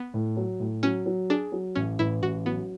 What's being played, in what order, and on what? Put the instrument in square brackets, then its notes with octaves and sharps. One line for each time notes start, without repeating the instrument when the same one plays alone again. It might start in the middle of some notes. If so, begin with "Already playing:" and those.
Already playing: [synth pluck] B3
[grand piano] A2
F#3
A2
[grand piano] F#3 [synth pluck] C#4
[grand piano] F#3
[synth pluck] D4 [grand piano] G#4
[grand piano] F#3
[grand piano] A1 [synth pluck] C#4
[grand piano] A1 [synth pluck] E4
[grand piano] A1 [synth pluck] F#4
[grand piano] F#3 [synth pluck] B3